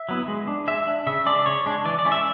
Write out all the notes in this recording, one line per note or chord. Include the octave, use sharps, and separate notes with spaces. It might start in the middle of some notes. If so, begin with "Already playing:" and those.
Already playing: E5
F#3 B3 E4
G#3
D4
G#3 E5
D4
C#3 E5
G#3 D4 D5
C#3 C#5
G#3 D4
E3 D5
D5
G#3 C#4 E4
E5